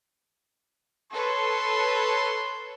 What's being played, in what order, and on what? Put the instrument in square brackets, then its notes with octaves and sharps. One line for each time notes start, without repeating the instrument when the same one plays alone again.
[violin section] A4 B4 C#5 [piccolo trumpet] C6